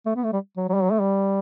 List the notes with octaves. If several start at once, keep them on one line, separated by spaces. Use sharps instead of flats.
A3
B3
A3
G3
F#3
F#3
G3
F#3
A3
G3